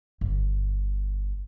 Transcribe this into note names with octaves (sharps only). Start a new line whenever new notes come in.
G1